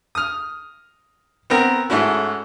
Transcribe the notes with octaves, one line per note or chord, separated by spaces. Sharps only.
D#6 F6
B3 C4 A#4
G#2 A3 C#4 E4 F#4